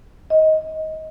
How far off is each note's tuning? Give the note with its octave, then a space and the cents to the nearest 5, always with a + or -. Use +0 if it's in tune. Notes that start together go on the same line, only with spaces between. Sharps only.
D#5 +15